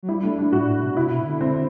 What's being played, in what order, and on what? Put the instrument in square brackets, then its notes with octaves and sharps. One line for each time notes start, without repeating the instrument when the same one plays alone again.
[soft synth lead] F#3
[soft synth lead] G3 [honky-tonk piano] E4
[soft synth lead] A3 [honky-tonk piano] D4
[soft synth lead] G3 [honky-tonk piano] D4
[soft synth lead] A2 [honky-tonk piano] F#4
[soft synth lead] A2
B2
[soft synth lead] C3 [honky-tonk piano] E4
[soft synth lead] B2
D3
[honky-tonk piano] C4